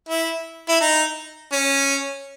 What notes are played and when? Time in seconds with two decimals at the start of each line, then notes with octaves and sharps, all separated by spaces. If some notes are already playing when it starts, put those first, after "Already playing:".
0.09 E4
0.69 E4
0.81 D#4
1.52 C#4